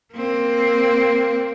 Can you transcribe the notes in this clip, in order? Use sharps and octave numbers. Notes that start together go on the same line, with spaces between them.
A#3 C4